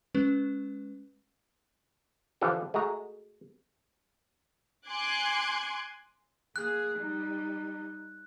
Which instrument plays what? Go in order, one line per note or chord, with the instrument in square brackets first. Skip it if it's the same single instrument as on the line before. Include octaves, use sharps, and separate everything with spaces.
[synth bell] G#3 C#4 B4
[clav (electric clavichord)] D3 E3 F3 D4 G4 A4
G#3 A3 F#4 A#5
[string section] G#5 C6 D6 F#6 G#6
[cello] A#3 G#4 [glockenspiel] F#6
[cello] G3 D#4